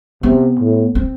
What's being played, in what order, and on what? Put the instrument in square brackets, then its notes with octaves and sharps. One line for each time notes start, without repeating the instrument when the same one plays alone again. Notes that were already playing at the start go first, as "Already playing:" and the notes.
[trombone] C3 [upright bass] B3
[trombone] A2
[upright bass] C4